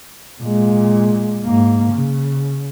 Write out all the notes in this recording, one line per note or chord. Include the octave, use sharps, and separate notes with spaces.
A#2 G#3
G#2 A#3
C#3